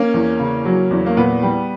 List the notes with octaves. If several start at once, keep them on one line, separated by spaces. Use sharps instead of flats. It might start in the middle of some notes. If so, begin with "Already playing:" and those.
Already playing: A#3 C#4
E2
C#3
F#3
E2
A#3
A#2 B3
G3